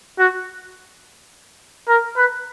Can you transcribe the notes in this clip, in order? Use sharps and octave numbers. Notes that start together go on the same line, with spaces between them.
F#4
A#4
B4